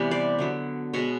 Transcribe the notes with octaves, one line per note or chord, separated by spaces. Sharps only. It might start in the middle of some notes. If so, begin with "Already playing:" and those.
Already playing: C3 E3 G3 B3
C5 D5
D3 F#3 B3
B2 G#3 B3 C#5 D#5